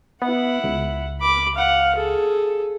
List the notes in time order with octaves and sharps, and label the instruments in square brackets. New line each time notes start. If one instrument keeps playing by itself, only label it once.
[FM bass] B3 [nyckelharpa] E4 F#5
[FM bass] C#2
[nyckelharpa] B5 D6
F5 F#5
G#4 A4